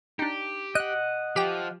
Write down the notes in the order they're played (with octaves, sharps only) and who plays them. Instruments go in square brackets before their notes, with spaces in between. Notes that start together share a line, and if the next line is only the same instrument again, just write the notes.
[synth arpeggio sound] D4 D#4 [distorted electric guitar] G4
[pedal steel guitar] D#5 F#5 [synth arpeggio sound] F#6
[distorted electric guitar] F3 [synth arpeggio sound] G4 G5